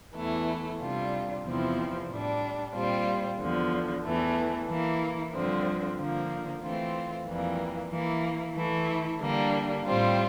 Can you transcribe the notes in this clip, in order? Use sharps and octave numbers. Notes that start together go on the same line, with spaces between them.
E2 E3 A3 E4
C3 G3 D4 F4
E2 C3 F3 C4 E4
A2 G3 D4
A#2 G3 C4 F4
E2 D3 F3
E2 E3 A3
E3 A#3 E4
G2 D3 F3 C4
D3 F3 A#3
E3 A3 C4 F4
F2 E3 G3 A#3
E3 A#3 E4
E3 A3 E4
D3 G3 A#3 D4
A2 G3 C4 F4